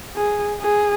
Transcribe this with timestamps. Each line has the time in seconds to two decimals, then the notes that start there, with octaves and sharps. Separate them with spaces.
0.15 G#4
0.60 G#4